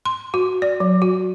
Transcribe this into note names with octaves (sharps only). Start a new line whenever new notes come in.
C6
F#4
D5
F#3
F#4